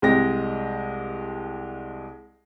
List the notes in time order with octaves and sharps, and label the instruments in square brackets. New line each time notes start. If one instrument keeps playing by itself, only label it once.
[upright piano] C2 G#3 G4 A#6